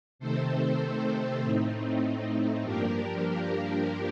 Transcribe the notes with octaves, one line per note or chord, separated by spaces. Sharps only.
C3 D#3 A3 C4 A4 C5
A2 A3 C4 D#4
G2 F3 A#3 D4 G4 A#4
G4 A#4